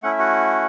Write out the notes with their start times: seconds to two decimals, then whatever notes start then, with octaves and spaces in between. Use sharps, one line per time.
0.03 A3 C#4 E4 F#5
0.11 E5
0.19 F#4 F#5